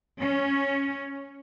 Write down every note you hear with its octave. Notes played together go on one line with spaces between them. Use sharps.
C#4